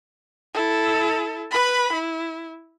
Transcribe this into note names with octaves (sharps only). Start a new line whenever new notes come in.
E4 A4
B4 B5
E4